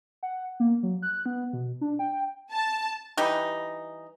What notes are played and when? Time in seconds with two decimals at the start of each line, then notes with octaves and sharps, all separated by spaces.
0.23 F#5
0.60 A#3
0.83 F#3
1.02 F#6
1.26 B3
1.53 B2
1.81 D4
1.99 G5
2.51 A5
3.17 E3 G3 D#4